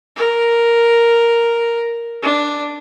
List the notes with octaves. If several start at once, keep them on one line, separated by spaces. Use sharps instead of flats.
A#4
D4